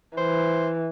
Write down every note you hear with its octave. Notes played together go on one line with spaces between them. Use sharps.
E3 C5